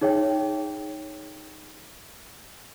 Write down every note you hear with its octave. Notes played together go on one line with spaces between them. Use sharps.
D#4 G#4 C#5 E5 G5